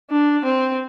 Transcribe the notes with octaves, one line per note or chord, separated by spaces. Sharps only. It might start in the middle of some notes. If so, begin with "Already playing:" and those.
D4
C4